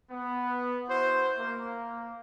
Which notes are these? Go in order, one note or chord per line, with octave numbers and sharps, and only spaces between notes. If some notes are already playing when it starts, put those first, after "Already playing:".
B3
E4 F#4 C5
A#3